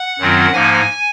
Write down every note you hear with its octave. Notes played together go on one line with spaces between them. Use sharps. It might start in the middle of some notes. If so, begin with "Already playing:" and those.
Already playing: F#5
F#2 D#3 F#3 C4 F4
G#2 F3 A#3 D#4 G#5